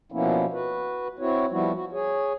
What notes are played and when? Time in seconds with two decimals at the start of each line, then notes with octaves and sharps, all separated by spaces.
0.12 B2 F3 A#3 B3 C#4 E4
0.53 F#4 B4
1.19 C4 E4 F#4 C#5
1.51 F3 G3 B3 E4 F#4
1.74 F#4
1.93 G#4 C#5